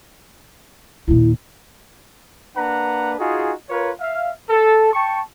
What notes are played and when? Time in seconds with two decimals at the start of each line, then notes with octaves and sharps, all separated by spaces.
1.08 D#2 A#2 E4
2.57 A#3 D4 B4 F#5 A#5
3.19 D#4 F4 F#4 G#4
3.69 F4 A#4 B4 C#5
4.00 E5 F5
4.50 A4
4.94 G5 A5 C#6